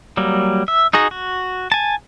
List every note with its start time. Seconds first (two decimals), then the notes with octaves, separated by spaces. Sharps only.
0.17 F#3 G3 A#3
0.68 E5
0.93 D#4 F#4 G#4 A#5
1.11 F#4
1.72 G#5 A5